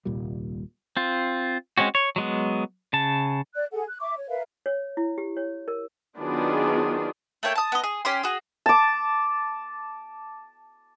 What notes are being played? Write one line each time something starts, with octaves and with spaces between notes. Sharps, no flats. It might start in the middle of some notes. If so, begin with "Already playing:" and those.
D#1 C2 A#2 G3
C4 F4
G#3 C4 C#4 F#4
C#5
F#3 G#3 B3
C#3 A5
D5 F#6
G#4 A4 F#5
F#6
E5 C#6 D6
C#5
A#4 B4 E5 F5
C#5
E4
G4
C#5
A#4
D#3 F#3 B3 D4 F4 G#4
A3 A#3 C#5 G5
A5 D#6
B3 D#5
G#4
C#4 G4 C6
F#4 G#4
A5 D6